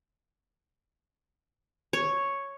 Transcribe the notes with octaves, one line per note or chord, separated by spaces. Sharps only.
C#5